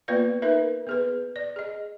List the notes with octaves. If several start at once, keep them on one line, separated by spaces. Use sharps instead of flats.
A#3 B3 F4 B4 D5 F5
D#4 A#4 B4 E5
B3 G#4 B4
D5
G#4 D#5